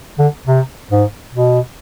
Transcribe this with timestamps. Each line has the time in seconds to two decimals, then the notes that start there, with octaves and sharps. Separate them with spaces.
0.19 D3
0.47 C3
0.91 G#2
1.33 B2